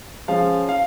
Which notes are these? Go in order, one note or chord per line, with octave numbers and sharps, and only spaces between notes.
F3 G#3 C#4 F5
F5